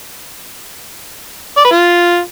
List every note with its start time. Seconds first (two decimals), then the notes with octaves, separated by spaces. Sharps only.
1.57 D5
1.65 B4
1.72 F4